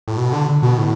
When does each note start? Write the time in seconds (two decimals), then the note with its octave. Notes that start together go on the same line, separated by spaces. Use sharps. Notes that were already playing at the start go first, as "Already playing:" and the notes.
0.08 A2
0.17 B2
0.33 D3
0.63 B2
0.78 A2